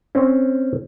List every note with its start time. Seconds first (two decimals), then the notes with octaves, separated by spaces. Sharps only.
0.15 C4 C#4